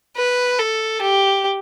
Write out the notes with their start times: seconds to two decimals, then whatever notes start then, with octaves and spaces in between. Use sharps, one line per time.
0.17 B4
0.59 A4
1.02 G4